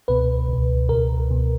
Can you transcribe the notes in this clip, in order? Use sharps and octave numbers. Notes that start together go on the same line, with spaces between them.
C#2 B2 B4
C#2 B2
C#2 B2 A#4
C#2 B2